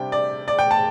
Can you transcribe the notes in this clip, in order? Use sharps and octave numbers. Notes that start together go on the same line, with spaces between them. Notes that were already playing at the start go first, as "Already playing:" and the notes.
Already playing: C3 G3 D4 G5
D5
D5
G5
A5